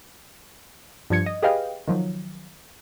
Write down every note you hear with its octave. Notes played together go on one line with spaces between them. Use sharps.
G2 F3 D4 G#6 C#7
D#5
G4 G#4 B4 D#5 F5 G5
D#3 F3 F#3